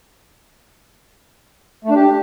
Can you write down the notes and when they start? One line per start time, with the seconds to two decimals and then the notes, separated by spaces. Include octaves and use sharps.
1.85 A3
1.90 D4
1.96 G4